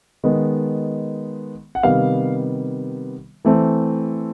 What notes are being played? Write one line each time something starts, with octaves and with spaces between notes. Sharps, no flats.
D#3 G#3 B3
F#5
C3 D#3 G3 B3 F5
E3 A3 C4